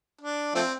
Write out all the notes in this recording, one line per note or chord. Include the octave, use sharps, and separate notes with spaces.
D4
F3 A3 C4